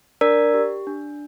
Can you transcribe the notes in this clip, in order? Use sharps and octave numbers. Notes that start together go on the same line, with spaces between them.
D4 A#4 D5
G4
D4